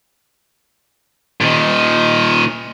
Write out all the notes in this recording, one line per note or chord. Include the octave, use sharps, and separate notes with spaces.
A#2 D#3